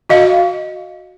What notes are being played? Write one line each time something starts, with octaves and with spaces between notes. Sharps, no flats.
F#4 D#5 F5